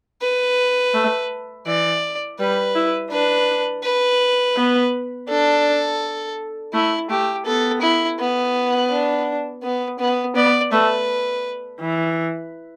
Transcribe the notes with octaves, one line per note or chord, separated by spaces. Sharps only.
B4
A3
E3 D5
G3 B4
E4
D4 B4
B4
B3
D4 A4
A3 E4
A3 G4
B3 A4
E4
B3
D4
B3
B3
B3 D5
A3 B4
E3